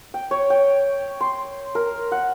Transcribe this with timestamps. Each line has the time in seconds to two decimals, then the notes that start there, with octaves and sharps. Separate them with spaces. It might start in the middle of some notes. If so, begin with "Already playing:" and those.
0.14 G5
0.31 C#5
0.50 G5
1.21 C6
1.75 A#4
2.12 F#5